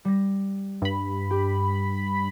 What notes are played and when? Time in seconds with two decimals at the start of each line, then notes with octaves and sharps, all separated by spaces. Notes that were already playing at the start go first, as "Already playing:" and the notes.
0.05 G3 A#6
0.82 G2 B5
1.31 G4